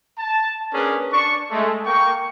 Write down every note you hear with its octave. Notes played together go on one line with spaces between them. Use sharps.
A5
A#3 C#4 D4 G#4 A#4 B4
D4 C#6
G#3 A3
A#3 G5 C#6